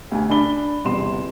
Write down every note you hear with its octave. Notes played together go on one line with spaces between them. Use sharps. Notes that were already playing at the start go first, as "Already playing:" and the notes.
D2 G4 G#5
D4 A5 B5 G7
G1 E2 C3 C6 E7